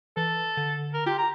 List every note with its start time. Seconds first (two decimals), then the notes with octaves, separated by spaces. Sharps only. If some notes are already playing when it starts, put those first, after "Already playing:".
0.17 E3 A4
0.57 D3
0.94 A#4
1.06 F4 G4
1.18 A#5